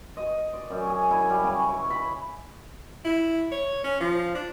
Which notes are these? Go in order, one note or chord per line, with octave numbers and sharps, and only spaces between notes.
D#5
D5
F#2
G#4
E4
G3
C#3
C#5
B5
E4
C#5
C#4
F3
D4